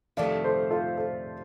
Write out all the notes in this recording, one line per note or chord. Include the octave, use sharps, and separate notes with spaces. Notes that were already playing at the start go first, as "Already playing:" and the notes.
F2 C3 D#3 A3 D5 F5
A4 C5
F4 A4
A4 C5